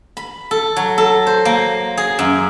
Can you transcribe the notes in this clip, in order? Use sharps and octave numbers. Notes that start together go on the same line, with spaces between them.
B5
A4
F#3
A4
C5
A#3
G#4
F#2